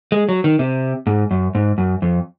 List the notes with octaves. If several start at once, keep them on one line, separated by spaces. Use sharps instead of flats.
G#3
F#3
D#3
C3
G#2
F#2
G#2
F#2
F2